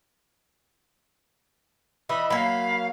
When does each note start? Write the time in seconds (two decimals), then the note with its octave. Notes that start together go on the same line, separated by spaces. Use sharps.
2.09 E3 D#5 E5 B5
2.30 F#3 A#3 F5 B5